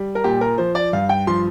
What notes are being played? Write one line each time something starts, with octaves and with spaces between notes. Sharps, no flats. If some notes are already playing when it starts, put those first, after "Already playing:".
Already playing: G3
A#4
A#2 G4
A#4
F3 C5
D5
G2 F5
G5
F3 C6